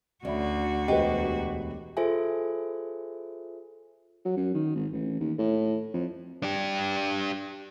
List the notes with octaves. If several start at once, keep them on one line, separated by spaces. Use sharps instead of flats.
D2 C#4 F#4 D5 E5 B5
E1 G4 B4 C5 D#5
F4 G#4 A4 C5 E5 G#5
F#3
F#2
D#3
G#1
A1
D#2
A2
F2
D4 G4